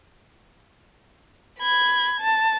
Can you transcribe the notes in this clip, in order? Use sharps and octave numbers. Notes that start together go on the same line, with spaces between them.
B5 G#6
A5